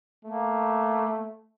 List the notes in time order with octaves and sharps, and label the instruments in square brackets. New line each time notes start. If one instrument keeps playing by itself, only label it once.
[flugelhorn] A3 [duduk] A#3